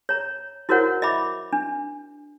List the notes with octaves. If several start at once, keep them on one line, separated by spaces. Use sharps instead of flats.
C#5 A#5
E4 F#4 A#4 C5 C#5 F#5
D#5 E5 B5 D6
D4